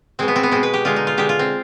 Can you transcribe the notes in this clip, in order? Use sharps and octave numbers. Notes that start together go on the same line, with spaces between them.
B2 G#3 C4
B3
C4
B3
B2 G#3 C4
B4
G4
D3 G#3 F4
D#4
F4
D3 G#3 G4
F4
C4